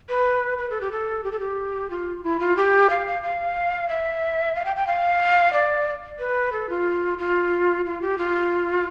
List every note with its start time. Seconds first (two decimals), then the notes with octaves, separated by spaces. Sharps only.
0.09 B4
0.58 B4
0.70 A4
0.81 G4
0.92 A4
1.24 G4
1.32 A4
1.40 G4
1.90 F4
2.24 E4
2.40 F4
2.57 G4
2.90 F5
3.07 F5
3.23 F5
3.89 E5
4.55 F5
4.65 G5
4.76 G5
4.87 F5
5.53 D5
6.19 B4
6.52 A4
6.69 F4
7.18 F4
7.85 F4
8.01 G4
8.18 F4